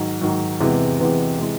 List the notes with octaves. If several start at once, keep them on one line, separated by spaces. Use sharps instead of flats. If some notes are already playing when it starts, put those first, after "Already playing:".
Already playing: G#2 D#3 F#3
G#2 D#3 F#3
E2 C3 E3 G#3 B3
E2 C3 E3 G#3 B3
C3 E3 G#3